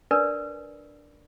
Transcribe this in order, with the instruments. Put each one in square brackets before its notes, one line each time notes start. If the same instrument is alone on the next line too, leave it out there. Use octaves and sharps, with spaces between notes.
[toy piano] D4 A#4 B4 D5